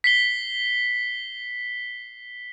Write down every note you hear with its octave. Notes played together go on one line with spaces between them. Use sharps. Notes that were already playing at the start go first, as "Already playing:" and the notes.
B6 C7 G7